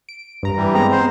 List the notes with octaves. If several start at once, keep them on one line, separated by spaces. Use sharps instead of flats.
D7
G2 A#5
E3 G3
G#3 B3 C4 A#5
C5